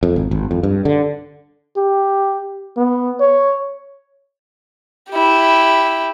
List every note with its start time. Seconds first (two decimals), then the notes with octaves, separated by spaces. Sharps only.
0.03 F2
0.16 G#1
0.31 G#1
0.51 F2
0.63 G2
0.85 D3
1.77 G4
2.77 B3
3.20 C#5
5.11 E4 G4